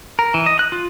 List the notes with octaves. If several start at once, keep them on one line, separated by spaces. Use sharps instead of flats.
A#4
E3
D#5
F#6
F4